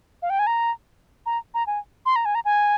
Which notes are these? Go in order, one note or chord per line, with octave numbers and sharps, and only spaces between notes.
F5
G5
G#5
A#5
A#5
A#5
G#5
C6
A#5
G#5
A#5
G#5